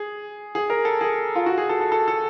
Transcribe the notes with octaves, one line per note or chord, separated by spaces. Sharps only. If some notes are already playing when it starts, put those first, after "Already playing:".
Already playing: G#4
G#4
A#4
A4
G#4
F4
F#4
G#4
A4
A4
A4
A4